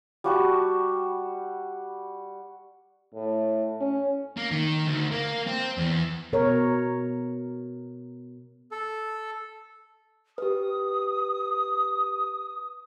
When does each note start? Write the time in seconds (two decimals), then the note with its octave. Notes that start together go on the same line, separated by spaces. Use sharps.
0.24 G3 F#4 A5
3.14 A2
3.81 C#4
4.37 A#3
4.51 D#3
4.87 D2
5.12 A#3
5.47 C4
5.78 E2
6.33 B2 A#4 C#5
8.71 A4
10.38 G4 B4 D#6